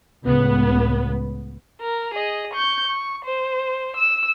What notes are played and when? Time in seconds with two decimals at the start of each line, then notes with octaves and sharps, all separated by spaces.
0.24 C#2 A2 B3
1.81 A#4
2.14 G#4 D#5
2.53 C#6 G6
2.87 C#6
3.25 C5
3.96 E6 E7